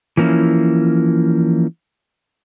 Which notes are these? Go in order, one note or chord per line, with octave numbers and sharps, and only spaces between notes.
E3 F3 A#3 C#4 E4